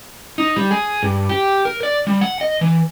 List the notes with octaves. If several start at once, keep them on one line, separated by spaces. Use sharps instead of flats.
D#4
G3
G#4
G2
G4
A#4
D5
G3
F#5
D#5
E3